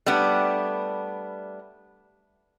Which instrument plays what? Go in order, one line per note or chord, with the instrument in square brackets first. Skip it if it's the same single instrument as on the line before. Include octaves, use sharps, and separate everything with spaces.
[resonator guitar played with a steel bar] G3 A3 B3 D4